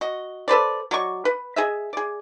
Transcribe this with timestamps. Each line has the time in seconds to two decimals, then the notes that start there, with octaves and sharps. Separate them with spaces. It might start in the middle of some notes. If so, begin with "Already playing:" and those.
0.01 F#4 D#5
0.48 A4 B4 C5 D5
0.91 F#3 D5 D#5 C#6
1.25 B4
1.56 G#4 D#5 E5
1.93 G#4 D5